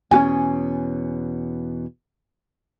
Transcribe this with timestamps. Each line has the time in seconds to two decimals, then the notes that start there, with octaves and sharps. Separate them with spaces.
0.11 E2 B2 C#4 F#4 G#5